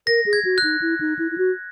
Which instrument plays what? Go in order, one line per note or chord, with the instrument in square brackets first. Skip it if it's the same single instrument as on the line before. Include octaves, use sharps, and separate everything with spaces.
[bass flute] A#4 [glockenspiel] A#6
[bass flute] G#4
[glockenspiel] G#6
[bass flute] F#4
[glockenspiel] F#6
[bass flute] D#4
E4
D#4
E4
E4
F#4